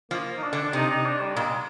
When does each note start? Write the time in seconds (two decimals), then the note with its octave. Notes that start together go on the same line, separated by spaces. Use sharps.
0.11 F3 A#3
0.37 D#4
0.43 D4
0.53 D3
0.62 D4
0.73 C3 D#4
0.89 D#4
1.06 D4
1.21 G3
1.36 A#2 G#3